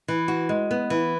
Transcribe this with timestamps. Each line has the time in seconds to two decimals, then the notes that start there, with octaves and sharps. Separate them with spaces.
0.08 E3
0.28 F#4
0.49 G#3
0.71 B3
0.90 E3